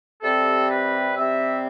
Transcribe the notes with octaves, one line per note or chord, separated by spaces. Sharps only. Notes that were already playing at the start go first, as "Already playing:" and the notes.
C3 G3 C4 A4
B4
C3 G3 C4 E5